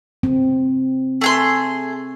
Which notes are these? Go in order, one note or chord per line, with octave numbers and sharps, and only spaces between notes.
C4
A3 G#4 C6